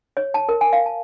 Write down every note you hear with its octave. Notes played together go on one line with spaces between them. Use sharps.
C#5
A5
A#4
G#5
F5
A5